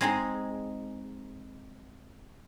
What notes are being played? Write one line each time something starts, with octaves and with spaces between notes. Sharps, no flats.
G#3 C4 D#4 G#4